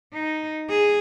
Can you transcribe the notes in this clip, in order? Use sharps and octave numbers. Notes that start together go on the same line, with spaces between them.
D#4
G#4